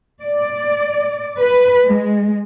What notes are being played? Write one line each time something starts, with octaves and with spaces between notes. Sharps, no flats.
D5
B4
G#3